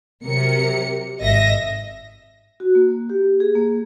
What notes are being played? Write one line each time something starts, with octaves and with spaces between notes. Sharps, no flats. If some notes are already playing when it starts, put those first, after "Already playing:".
C3 F#3 A#4 C#7
G#1 D#5 E5 A#6
F#4
A#3
A#3
G4
G#4
A#3